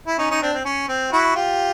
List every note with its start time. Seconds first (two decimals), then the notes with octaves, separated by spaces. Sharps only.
0.07 E4
0.18 C#4 D#4
0.30 C#4 D#4
0.42 C4 D4
0.53 C4
0.65 C#4
0.89 C4
1.12 E4 F#4
1.35 F4 G4